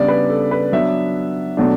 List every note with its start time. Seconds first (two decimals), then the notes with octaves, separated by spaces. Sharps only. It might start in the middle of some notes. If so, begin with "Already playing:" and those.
Already playing: C#3 G3 B3 D4 D5
0.08 B4
0.30 A4
0.51 B4
0.73 F#3 B3 D4 E5
1.57 B2 F#3 A3 D4